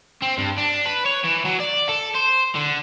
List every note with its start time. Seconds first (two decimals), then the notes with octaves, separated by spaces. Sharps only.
0.22 C4
0.38 G2
0.58 D4
0.85 B4
1.05 C#5
1.24 E3
1.45 F#3
1.60 D5
1.89 A4
2.15 C5
2.55 D3